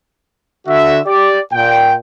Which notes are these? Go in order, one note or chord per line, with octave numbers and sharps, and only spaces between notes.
D3 F#4 E5
G4 D5
A#2 G5